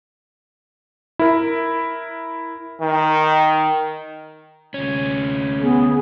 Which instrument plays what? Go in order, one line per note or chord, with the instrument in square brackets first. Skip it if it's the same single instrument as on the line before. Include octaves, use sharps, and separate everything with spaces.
[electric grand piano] E4 A#4
[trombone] D#3
[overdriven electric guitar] D2 C#4
[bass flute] B3 [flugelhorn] G#4